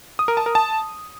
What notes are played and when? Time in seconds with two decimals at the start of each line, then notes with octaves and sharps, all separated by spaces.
0.19 D#6
0.28 A#4
0.37 A5
0.46 A#4
0.55 A5